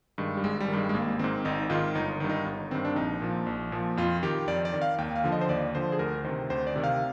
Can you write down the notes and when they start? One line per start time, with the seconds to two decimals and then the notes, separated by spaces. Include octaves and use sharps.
0.18 G2 D#3 G#3
0.37 G3
0.44 G#1 G#3
0.60 G3
0.68 D#3
0.73 G2 G#3
0.89 G#3
0.94 G#1 A#3
1.19 G#2 D#3 C4
1.45 G#1 D#4
1.70 G#2 D#3 F4
1.95 G1 D#4
2.20 G2 D#3
2.29 D#4
2.46 G1
2.71 G2 D#3 C4
2.85 D4
2.96 A#1 D#4
3.22 A#2 F3
3.47 A#1
3.72 A#2 F3
3.97 F2 F4
4.23 D#3 G4
4.48 F2 D5
4.65 D5
4.74 D#3
4.82 F5
4.98 D#2 G5
5.16 F5
5.24 D3 F3
5.32 D#5
5.41 C5
5.49 D#2 D5
5.75 D3 F3 C5
5.92 G#4
5.99 D2 A#4
6.25 C3 D#3 C5
6.50 D2 C5
6.67 D5
6.76 C3 D#3
6.84 F5